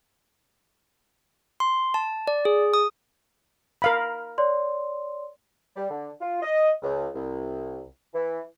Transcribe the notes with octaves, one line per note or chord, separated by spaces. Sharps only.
C6
A5
D5
G#4
D#6
A#4 F5 B5
C#5 D5 C6
G3
D3
F4
D#5
C#2
C2
E3